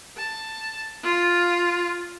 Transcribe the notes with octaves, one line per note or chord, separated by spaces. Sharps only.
A5
F4